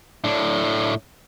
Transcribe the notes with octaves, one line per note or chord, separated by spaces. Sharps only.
A2 D4